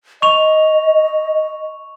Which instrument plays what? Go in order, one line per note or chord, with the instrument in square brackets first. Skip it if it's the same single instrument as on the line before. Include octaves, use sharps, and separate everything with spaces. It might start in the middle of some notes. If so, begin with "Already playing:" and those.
[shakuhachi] D#5 [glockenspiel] C#6 F7